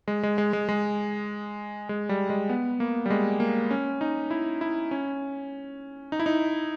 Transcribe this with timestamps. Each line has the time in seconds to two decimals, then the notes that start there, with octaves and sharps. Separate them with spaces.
0.08 G#3
0.23 G#3
0.38 G#3
0.53 G#3
0.69 G#3
1.89 G#3
2.09 G3
2.30 G#3
2.49 B3
2.80 A#3
3.06 G3
3.10 G#3
3.40 A#3
3.71 C#4
4.01 D#4
4.31 E4
4.61 E4
4.91 C#4
6.12 D#4
6.20 E4
6.26 D#4